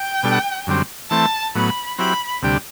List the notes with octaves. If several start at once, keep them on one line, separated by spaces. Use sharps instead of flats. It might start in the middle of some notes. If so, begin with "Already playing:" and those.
Already playing: G5
B2 G3 D4 A4
F#2 D3 G3 C4
E3 A3 C4 A5
A2 F#3 B3 B5
F#3 C4 E4 G4 B5
D2 C3 G3 D4 G4